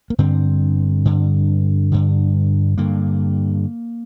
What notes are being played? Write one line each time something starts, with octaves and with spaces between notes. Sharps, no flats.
A#3
G2 D3 C4
G2 D3
G2 D3
G2 D3 A#3